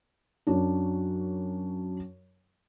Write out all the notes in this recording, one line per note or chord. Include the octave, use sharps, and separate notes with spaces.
F#2 F#3 D4